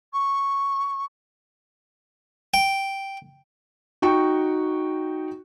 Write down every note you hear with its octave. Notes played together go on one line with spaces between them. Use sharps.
C#6
G5
D#4 F#4 G5 C#6